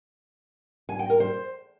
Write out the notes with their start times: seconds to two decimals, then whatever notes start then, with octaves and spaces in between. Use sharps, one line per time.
0.89 G#5
0.99 G5
1.10 A#4
1.20 C5